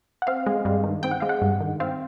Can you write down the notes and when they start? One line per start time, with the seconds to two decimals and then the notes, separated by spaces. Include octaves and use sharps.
0.22 F#5
0.27 C4 F5
0.46 G#3
0.65 G2
0.84 D#3
1.03 C4 G5
1.11 F#5
1.20 G#3 F5
1.29 F#5
1.42 G2
1.60 D#3
1.80 C4 F5